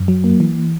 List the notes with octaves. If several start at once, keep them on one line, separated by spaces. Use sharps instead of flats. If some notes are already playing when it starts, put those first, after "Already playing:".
Already playing: F#2
F#3
A#3
E3